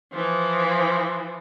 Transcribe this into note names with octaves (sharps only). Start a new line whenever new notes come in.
E3 F3